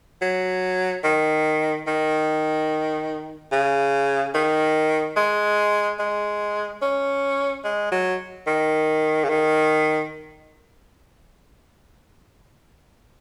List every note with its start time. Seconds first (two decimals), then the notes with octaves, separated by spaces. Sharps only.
0.22 F#3
1.04 D#3
1.87 D#3
3.52 C#3
4.34 D#3
5.17 G#3
5.99 G#3
6.82 C#4
7.64 G#3
7.92 F#3
8.47 D#3
9.24 C#3
9.29 D#3